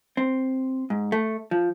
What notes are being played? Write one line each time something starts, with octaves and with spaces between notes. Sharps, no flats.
C4
G#2
A3
F3